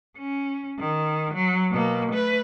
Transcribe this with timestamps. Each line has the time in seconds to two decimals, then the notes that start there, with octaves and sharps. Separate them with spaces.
0.18 C#4
0.79 D#3
1.34 F#3
1.71 B2 A#3
2.12 A3 B4